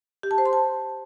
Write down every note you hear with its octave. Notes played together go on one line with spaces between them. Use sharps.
G4
A5
C5
C6
A5